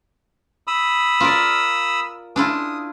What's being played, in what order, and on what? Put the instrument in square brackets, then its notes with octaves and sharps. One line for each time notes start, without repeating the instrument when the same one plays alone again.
[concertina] B5 D#6 E6
[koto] F4 A#4 D5
[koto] D4 E4 F4 [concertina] D#6